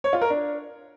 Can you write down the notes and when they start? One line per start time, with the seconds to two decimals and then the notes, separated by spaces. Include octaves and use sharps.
0.04 C#5
0.13 F4
0.21 A#4
0.30 D4